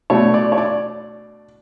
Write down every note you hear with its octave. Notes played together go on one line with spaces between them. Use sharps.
B2 A3 D4 C#5
D5
C#5
D5